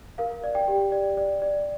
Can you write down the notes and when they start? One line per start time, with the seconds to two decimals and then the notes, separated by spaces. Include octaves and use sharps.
0.18 A#4 F5
0.44 D5
0.55 G5
0.68 G4
0.92 D5
1.17 D5
1.42 D5